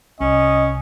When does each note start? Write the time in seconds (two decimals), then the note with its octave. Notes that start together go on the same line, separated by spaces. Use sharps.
0.20 C2 C#4 D#5